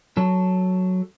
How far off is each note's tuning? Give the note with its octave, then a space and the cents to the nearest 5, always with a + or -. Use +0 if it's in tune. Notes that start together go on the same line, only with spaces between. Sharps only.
F#3 +0 A4 +0